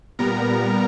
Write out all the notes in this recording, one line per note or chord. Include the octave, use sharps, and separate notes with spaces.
A#2 G3 B3 A#4 A#5